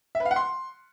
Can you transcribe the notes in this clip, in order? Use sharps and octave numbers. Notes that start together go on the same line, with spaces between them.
E5
B4
F5
F#5
C6